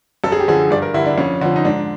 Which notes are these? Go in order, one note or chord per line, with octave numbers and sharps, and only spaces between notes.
F#2 A4
G#4
G4
D3 F3 G#4
G2 D5
A#4
D3 G3 E4
D4
F2 C#4
D3 F3
D#4
G#2 D4